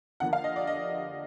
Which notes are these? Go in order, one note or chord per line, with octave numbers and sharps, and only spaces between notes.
D3 F3 A#3 F#5
F5
D#5
D5
D#5